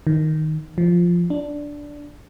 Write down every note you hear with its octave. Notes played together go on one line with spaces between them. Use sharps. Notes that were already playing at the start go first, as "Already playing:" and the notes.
D#3
F3
D4